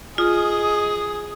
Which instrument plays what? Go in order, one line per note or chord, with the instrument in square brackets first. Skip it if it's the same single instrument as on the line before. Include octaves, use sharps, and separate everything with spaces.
[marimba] F4 [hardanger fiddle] G#4 [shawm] D#5 [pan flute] D#6